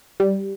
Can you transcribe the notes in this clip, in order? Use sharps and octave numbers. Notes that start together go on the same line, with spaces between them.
G3